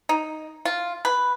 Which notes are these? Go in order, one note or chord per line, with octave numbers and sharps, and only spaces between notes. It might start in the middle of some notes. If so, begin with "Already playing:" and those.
D#4
F4
B4